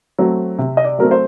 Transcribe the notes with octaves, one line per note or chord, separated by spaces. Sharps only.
F#3 A3 C4
C3
D#5
D5
F#3 A3 C4 A#4
C5